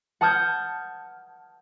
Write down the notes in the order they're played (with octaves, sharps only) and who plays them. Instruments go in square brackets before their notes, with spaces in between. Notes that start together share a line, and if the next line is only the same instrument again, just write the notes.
[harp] F#5 A5 D#6 F6 G6 G#6